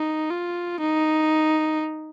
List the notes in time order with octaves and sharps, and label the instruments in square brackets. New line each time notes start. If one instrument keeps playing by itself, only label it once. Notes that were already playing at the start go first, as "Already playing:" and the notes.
Already playing: [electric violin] D#4
F4
D#4